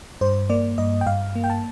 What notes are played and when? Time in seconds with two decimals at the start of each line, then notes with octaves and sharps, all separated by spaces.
0.21 G2 C5
0.50 A#3 D5
0.78 G2 D#5
1.01 G5
1.06 G2 F5
1.35 A#3
1.44 G5
1.50 A5